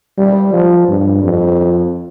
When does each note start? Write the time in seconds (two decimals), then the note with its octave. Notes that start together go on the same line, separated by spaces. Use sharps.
0.18 G3
0.53 F3
0.88 G2
1.23 F2